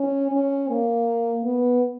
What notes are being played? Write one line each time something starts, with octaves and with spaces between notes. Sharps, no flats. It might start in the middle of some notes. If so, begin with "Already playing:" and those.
Already playing: C#4
C#4
A#3
B3